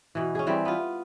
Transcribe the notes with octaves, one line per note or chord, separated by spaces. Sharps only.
B2 E3
C#4 G#4
E3 G3 C4
B3 F4